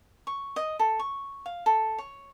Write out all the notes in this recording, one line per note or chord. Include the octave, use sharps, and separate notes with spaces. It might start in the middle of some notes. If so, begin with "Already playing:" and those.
C#6
D#5
A4
C#6
F5
A4
C#5